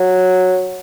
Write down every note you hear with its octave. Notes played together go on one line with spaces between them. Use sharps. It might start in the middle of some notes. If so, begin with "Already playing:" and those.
Already playing: F#3